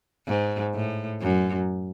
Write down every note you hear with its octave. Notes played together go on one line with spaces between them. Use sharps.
G#2
A2
F#2